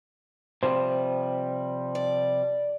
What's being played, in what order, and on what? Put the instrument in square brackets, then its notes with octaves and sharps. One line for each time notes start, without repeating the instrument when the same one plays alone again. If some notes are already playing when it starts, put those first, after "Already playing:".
[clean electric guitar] C3 F3 G3 [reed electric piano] C5 G5
[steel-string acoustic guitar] D5